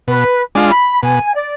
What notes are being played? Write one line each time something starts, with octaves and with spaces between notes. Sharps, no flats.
B2 B4
G#3 D4 F4
B5
B2 G#5
D5